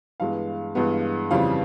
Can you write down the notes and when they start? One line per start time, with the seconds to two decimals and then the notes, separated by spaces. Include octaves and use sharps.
0.20 G2 E3 G#3 B3 F5
0.75 G2 E3 G#3 B3
1.31 F2 C#3 E3 G3 C4 F5